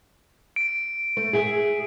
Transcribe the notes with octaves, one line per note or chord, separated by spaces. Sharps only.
D7
A3
G#4 E5 G#5